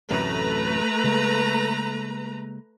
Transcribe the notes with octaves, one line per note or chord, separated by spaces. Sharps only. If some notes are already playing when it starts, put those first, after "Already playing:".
A1 F#2 C3 A3 B4 A#5
C#3 G#3 A#3